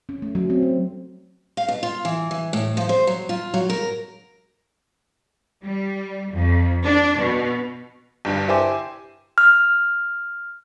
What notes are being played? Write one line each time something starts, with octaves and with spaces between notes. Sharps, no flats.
C#4
A3
F#3
C4
F#3
F5
B2
F4
E3
E3
A2
F3
C5
F#3
F4
F#3
A#4
G3
F2
D4
B2
G1 G2 D4
E4 G4 C5 G#5 D6
F6